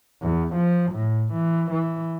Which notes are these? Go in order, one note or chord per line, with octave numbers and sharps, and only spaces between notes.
E2
F3
A2
E3
E3